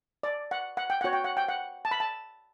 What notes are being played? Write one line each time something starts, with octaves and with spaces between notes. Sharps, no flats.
D5
F#5
F#5
G5
F#4 C#5 F#5
G5
F#5
G5
F#5
A5
B5
A5